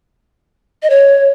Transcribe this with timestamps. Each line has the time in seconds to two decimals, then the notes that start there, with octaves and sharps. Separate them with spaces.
0.83 D#5
0.90 C#5